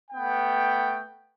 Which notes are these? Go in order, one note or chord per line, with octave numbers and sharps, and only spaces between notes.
A3 B3 G5